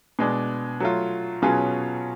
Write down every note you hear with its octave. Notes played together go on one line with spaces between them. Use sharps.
B2 G#3 D4
F#3 A3 F4
B2 F#3 C#4 F4 G#4